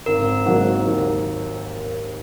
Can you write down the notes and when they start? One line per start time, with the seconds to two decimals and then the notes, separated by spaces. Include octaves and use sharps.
0.06 G#1 A#4
0.46 G#2 D#3 F#3 A#3
0.86 D#2